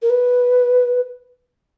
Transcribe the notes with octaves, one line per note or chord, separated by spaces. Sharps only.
A#4
B4